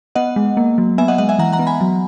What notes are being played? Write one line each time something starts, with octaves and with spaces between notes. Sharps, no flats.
B3 D#5 F#5
G#3
A#3
F#3
B3 E5 G#5
D#5 F#5
G#3 D#5 F#5
E5 G#5
E3 F#5 A#5
F#5 A#5
B3
G#5 B5
F#3